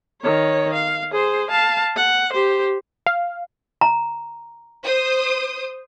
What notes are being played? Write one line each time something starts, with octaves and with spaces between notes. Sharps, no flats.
D#3 C#5
F5
G#4 C5
F5 A5
F#5
G4 C5
F5
A#5
C5 D#6